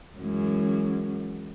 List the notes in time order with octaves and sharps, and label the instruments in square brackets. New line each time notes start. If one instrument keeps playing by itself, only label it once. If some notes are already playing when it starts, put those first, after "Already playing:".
[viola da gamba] F#2 E3 G#3